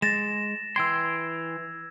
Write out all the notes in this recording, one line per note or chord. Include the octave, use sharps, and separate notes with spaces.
G#3 A6 A#6 E7
E3 G5 C6 E6 G#6